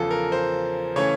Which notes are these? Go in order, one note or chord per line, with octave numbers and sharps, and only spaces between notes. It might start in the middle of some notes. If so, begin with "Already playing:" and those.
Already playing: E2 C#3 F3 A4
A#4
C5
C#3 E3 A3 C#4 C#5